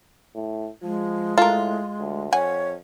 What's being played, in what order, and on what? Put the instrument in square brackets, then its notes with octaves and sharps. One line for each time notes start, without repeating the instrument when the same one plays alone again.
[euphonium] A2
[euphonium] F3 [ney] G#3
[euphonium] A2 [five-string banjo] F4 [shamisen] A4 A#4
[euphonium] D2
[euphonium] F2 [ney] C#5 [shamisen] F#5 G#5